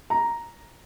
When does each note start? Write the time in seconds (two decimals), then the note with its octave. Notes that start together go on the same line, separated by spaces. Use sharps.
0.10 A#5